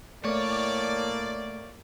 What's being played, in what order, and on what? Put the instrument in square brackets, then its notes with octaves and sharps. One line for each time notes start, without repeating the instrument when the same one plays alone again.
[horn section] A2 D5 [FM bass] A3 [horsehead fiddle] A#3 [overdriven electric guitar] C#5